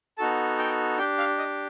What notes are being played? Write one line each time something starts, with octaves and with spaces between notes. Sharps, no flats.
B3 D#4 F#4 A4 A5
G5
D4 G4 G5
F5
D#5